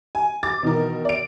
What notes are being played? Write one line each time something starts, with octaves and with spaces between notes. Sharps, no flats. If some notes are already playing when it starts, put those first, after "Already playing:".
G#5
D6 A6
B2 D#3 E3 A#4
D5 D7